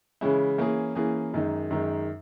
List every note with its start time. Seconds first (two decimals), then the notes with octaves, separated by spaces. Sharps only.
0.21 C#3 E3 G#3 C#4 E4
0.58 E3 A#3 C#4 G#4
0.95 E3 A#3 C#4 G#4
1.34 F#2 D#3 G#3 D#4
1.70 F#2 D#3 G#3 D#4